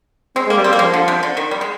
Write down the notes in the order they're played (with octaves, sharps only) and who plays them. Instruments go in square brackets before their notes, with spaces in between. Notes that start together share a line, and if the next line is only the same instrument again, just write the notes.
[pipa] G#3 [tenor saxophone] C4
[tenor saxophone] G#3
[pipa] A#3
[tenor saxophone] G3
[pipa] C4
[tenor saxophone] G3
[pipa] A#3
[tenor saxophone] F3 [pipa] G#3
[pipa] D3
C3
D3
D#3
G3
G#3